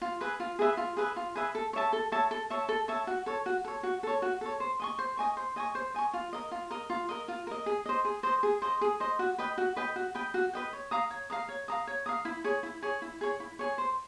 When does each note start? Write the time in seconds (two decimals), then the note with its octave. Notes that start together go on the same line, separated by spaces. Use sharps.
0.02 F4
0.21 G#4 B4 E5
0.40 F4
0.59 G#4 B4 E5
0.77 F4
0.97 G#4 B4 E5
1.16 F4
1.36 G#4 B4 E5
1.55 A4
1.73 C#5 E5 A5
1.93 A4
2.12 C#5 E5 A5
2.31 A4
2.50 C#5 E5 A5
2.69 A4
2.88 C#5 E5 A5
3.07 F#4
3.26 A4 C#5
3.46 F#4
3.65 A4 C#5
3.83 F#4
4.03 A4 C#5
4.22 F#4
4.41 A4 C#5
4.60 C5
4.80 D#5 G#5 C#6
4.98 C5
5.17 D#5 G#5 C#6
5.37 C5
5.56 D#5 G#5 C#6
5.75 C5
5.94 D#5 G#5 C#6
6.14 F4
6.33 A#4 D#5
6.51 F4
6.71 A#4 D#5
6.90 F4
7.09 A#4 D#5
7.28 F4
7.47 A#4 D#5
7.66 G#4
7.86 C5 D#5
8.05 G#4
8.23 C5 D#5
8.43 G#4
8.62 C5 D#5
8.81 G#4
9.00 C5 D#5
9.19 F#4
9.38 B4 D#5 G5
9.58 F#4
9.76 B4 D#5 G5
9.96 F#4
10.15 B4 D#5 G5
10.34 F#4
10.53 B4 D#5 G5
10.73 C#5
10.91 F5 A#5 D#6
11.11 C#5
11.30 F5 A#5 D#6
11.49 C#5
11.68 F5 A#5 D#6
11.87 C#5
12.06 F5 A#5 D#6
12.25 E4
12.44 G#4 C#5
12.63 E4
12.83 G#4 C#5
13.02 E4
13.21 G#4 C#5
13.40 E4
13.59 G#4 C#5
13.78 C5